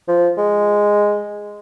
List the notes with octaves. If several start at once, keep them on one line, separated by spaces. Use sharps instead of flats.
F3
G#3